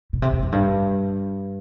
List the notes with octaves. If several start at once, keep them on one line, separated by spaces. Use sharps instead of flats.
B2
C3
B2
F#2
G2